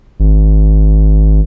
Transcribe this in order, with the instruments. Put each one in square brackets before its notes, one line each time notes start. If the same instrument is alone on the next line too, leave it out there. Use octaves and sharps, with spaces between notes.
[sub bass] G#1